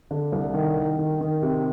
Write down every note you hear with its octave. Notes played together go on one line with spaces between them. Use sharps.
D3
C2
D#3
D#3
D#3
D#3
C3